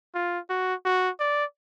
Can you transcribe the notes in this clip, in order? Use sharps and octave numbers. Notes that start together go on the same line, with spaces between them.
F4
F#4
F#4
D5